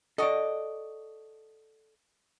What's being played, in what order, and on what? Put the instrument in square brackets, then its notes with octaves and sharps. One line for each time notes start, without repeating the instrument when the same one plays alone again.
[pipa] F#4 D#5 [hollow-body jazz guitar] A4 D5